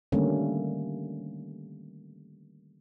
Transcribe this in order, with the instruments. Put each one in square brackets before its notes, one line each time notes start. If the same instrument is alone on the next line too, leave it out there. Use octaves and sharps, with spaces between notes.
[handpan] D3 D#3 G3 A3 A#3 C#4